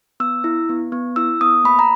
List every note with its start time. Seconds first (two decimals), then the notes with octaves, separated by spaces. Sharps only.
0.20 B3 E6
0.44 E4
0.69 B3
0.92 B3
1.16 E4 E6
1.41 B3 D#6
1.64 A#3 B5
1.79 A#5